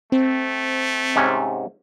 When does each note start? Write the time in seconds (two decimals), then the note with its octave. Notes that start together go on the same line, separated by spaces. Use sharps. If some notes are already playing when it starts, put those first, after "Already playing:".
0.12 A3 C4
1.16 G#2 C3 C#4